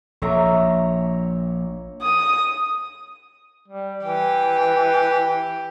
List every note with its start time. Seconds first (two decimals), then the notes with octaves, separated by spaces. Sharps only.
0.22 A#1 C#5 E5 A#5
2.02 D#6
3.68 G3
4.03 E3 G4